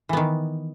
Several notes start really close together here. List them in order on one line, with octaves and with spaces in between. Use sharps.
E3 B3 D#3